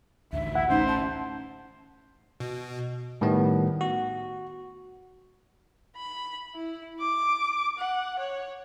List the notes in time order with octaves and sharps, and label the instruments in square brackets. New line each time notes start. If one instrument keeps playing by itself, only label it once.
[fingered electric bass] A1 D2 [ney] E5
[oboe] E4 [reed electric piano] F#5
[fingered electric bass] A1 A3 C#4 [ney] D#4 [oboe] C5
[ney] A5
[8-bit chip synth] B2
[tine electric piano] A2 D#3 G3 B3
F#4
[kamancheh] B5
E4
D6
F#5
C#5